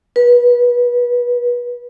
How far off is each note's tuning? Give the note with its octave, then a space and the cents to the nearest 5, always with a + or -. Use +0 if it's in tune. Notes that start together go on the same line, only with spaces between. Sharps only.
B4 -25